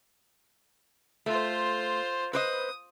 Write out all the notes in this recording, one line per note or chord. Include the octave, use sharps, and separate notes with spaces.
A3 F4 C5
B4 C5 D#5 D#6